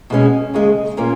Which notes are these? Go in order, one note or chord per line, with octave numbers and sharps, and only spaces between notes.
B2 G#3 C#4
D#2 C#3 G#3
A#2 A#3 C#4